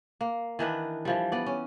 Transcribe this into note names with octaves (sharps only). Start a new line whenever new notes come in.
A#3
D#3 E3 D4 B4
E3 F3 G3
B3 D5
C#4